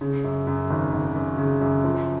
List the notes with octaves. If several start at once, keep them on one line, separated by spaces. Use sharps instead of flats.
C#3
F#2
F#2
G#1
G#1
F#2
C#3
F#2
F3